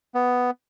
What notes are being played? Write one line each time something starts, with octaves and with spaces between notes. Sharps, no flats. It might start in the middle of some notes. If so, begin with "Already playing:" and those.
B3